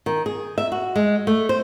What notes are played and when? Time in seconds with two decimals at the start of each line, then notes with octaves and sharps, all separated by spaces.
0.06 D#3
0.26 G#4
0.58 E5
0.72 F#4
0.96 G#3
1.27 A3
1.49 C5